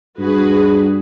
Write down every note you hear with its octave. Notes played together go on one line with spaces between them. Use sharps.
G2 F#4 G#4 B4